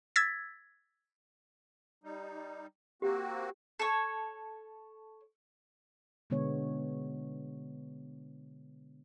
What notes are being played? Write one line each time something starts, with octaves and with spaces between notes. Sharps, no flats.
E6 G#6 A6 B6
G3 D#4
A#3 C4 F#4 G4
A4 C#5
B2 D3 G#3 B3 D4 C#5